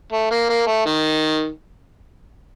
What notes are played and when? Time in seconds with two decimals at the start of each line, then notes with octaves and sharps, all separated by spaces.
0.12 A3
0.31 A#3
0.49 A#3
0.67 A3
0.85 D#3